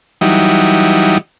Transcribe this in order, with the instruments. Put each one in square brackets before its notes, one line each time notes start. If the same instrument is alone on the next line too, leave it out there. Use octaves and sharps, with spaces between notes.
[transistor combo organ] E3 F#3 G3 D#4